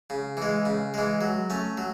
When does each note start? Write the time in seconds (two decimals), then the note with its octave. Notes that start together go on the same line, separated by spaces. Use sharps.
0.10 C#3
0.37 E3 G#3
0.66 C#3
0.94 E3 G#3
1.21 F#3
1.50 A3 C#4
1.77 F#3